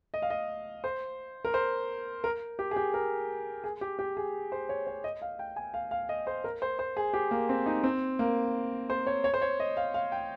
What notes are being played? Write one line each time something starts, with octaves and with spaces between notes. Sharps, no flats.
D#5
F5
D#5
C5
A#4
C5
A#4
G4
G#4
G4
A#4
G#4
G4
G4
G#4
C5
C#5
C#5
D#5
F5
G5
G#5
F5
F5
D#5
C5
A#4
C5
C5
G#4
G4
A#3
C4
D#4
C4
A#3
C5
C#5
C#5
C5
C#5
D#5
F5
F5
G5